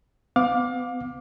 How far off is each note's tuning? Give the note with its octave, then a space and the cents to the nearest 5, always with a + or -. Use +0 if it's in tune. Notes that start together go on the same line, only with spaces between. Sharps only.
B3 +40 F5 +30 D6 +0